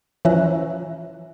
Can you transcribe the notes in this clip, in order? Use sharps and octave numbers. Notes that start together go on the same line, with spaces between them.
E3 F3 C#4 E5 A#5 F#6